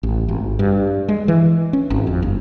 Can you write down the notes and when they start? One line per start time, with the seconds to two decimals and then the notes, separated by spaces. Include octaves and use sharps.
0.03 A1
0.29 G#1
0.59 G2
1.08 G#3
1.28 E3
1.73 C#4
1.90 G#1
2.07 F2
2.22 G1